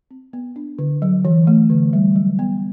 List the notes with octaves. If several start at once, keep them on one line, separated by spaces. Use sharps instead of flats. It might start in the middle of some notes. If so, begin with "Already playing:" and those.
C4
B3
D4
D3
F#3
E3
A3
D3
G3
F#3
B3